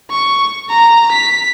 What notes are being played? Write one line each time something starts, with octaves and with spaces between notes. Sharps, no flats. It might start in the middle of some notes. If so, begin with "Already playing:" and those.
C#6
A#5
B6